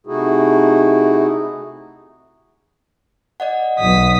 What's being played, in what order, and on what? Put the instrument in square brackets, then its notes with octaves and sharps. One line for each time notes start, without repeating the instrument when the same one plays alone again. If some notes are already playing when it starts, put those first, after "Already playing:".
[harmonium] C3 A3 D#4 E4 F#4 G#4
[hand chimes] D5 D#5 F#5
[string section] B1 [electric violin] D#6 B6